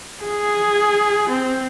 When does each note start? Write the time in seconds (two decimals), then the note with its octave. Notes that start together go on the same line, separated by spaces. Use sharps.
0.23 G#4
1.30 C4